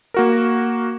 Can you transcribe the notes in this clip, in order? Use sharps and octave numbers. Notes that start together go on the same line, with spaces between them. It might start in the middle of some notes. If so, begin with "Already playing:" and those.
A#3 F#4 A#4